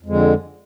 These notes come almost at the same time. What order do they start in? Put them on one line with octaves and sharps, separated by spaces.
F2 G#3 D3